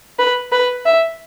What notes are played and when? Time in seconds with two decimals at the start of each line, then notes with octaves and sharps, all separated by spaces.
0.19 B4
0.52 B4
0.86 E5